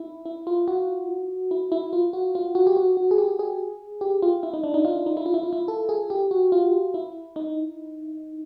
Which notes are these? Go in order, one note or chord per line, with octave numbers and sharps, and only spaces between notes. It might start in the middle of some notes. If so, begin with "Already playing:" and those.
Already playing: D#4 E4
E4
F4
F#4
E4
E4
F4
F#4
F4
F#4
G4
F#4
F#4
G#4
G4
G#4
G4
F4
E4
D#4
D4
D#4
F4
E4
D#4
E4
F4
E4
F4
E4
A4
G#4
G4
F#4
F4
E4
D#4